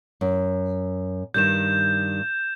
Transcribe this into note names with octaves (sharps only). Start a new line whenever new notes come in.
F#2
G2 D#3 G3 G6 E7